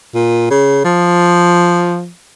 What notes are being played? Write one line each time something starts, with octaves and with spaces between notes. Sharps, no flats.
A#2
C#3
F3